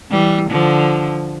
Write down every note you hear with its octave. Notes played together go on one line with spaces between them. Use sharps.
E3 G3
D3 F3